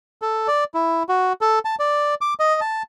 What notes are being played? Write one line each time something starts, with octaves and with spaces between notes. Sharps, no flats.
A4
D5
E4
F#4
A4
A5
D5
D6
D#5
A5